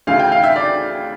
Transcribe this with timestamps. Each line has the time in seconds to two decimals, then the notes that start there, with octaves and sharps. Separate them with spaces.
0.07 D2 C#3 E3 F5
0.19 G5
0.32 F5
0.43 E5
0.56 D5